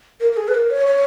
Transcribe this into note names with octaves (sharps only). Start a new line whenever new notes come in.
A#4
A#4
G#4
B4
A#4
C#5
C#5